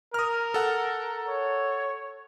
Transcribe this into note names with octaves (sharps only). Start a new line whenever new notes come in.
A#4 D#6 F6
A4 F#5
C#5